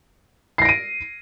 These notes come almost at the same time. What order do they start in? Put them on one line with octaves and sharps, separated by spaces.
C7 A#6 D7 D#7